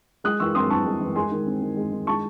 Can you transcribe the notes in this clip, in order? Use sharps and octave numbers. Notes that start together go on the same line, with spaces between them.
G#3 D#6 F#6
E3 C#6 E6
C4 C6 D#6
E3 A5 C#6
G#3
E3
G#3 G#5 C6
D#3
C4
D#3
G#3
D#3
G#3 A5 C#6